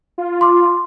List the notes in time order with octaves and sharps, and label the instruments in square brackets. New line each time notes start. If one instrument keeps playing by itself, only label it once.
[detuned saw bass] F4
[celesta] C6 D6